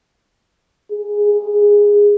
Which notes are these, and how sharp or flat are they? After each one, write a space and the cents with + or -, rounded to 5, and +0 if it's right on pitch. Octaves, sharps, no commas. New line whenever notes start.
G#4 -10